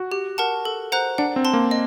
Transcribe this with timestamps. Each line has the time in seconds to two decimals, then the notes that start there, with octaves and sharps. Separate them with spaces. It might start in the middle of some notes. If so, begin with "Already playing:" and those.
Already playing: F#4
0.12 G4
0.38 A#4 F#5 A5
0.65 A4
0.92 C5 F#5 A#5 F#6
1.18 D4 F#5
1.36 C4
1.45 A5 C6
1.53 A#3
1.71 D#5